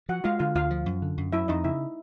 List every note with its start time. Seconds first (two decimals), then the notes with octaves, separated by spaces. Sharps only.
0.09 F3 F#4 F#5
0.24 G#3 F4 F5
0.39 D3 F4 F5
0.55 D2 F4 F5
0.70 F3
0.86 F#2
1.02 D3
1.18 F#2
1.33 F#3 E4 E5
1.48 F2 D#4 D#5
1.64 C#3 E4 E5